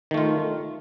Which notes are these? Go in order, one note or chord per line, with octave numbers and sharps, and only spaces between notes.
D#3 A3 F4